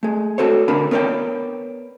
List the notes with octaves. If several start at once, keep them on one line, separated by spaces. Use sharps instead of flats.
A3 G#4
F#4 A4 C5 C#5
D3 D4 A#4 F5 B5
B3 A#4 C#5 D5 G5